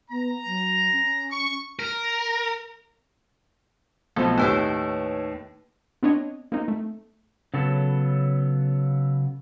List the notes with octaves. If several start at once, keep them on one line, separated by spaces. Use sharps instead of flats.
B3 A#5
F#3
C#4
C#6
A#4
B1 F3 A3 C4
D#2 A2 D#4 B4 C#5
B3 C4 D4 C#5 D#5
A#3 C4 D#4
A3
C#3 F#3 B3 A4